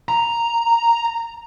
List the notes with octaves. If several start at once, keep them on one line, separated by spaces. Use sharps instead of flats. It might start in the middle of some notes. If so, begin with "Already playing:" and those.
A#5